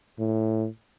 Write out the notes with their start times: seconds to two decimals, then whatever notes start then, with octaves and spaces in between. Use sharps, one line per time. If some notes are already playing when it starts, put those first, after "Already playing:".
0.19 A2